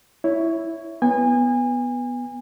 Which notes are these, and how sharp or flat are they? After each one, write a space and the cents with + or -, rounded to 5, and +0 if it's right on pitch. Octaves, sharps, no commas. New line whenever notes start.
E4 +0 C#5 +10
B3 +0 G#5 -30